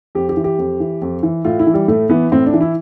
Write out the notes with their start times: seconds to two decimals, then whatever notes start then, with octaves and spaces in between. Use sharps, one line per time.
0.15 F2 G4
0.29 G4
0.37 E3
0.44 G4
0.58 F2
0.80 E3
1.02 F2
1.23 E3
1.45 A2 F4
1.59 E4
1.67 E3
1.74 G3
1.88 A2 A3
2.09 E3 B3
2.32 A2 C4
2.46 D4
2.54 E3
2.61 E4